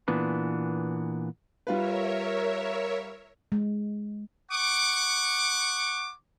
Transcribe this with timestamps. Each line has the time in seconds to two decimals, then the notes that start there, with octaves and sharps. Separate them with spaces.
0.08 A#2 E3 B3 D4
1.67 G3 F4 A#4 B4 C#5 E5
3.52 G#3
4.52 F#5 C#6 D6